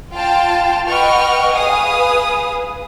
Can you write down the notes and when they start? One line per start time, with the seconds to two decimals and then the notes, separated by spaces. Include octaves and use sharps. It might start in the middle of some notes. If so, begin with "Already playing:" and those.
0.12 F4 F5 G5 A5
0.86 B4 D#5 F#5 G5 C#6 F6
1.55 G#4 B4 F5 G#5 D#6